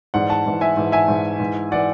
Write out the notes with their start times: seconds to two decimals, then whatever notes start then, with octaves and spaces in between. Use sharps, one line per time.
0.14 G#2 E3 D5 F#5
0.30 F#5 A5
0.46 G#2 E3
0.61 E5 G#5
0.77 G#2 E3
0.92 E5 G#5
1.08 G#2 E3
1.40 G#2 E3
1.72 E3 D5 F#5